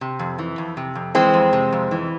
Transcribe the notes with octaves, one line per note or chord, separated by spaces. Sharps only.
C3
F2
E3
F2
C3
F2
E3 G#3 C4
F2
C3
F2
E3